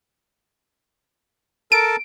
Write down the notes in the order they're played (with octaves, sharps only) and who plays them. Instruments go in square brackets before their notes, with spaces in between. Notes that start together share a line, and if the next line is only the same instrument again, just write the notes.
[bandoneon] A4 A#4 A5 [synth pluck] D7